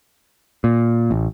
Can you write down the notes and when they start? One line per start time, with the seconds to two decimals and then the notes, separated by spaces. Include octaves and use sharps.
0.64 A#2
1.11 A1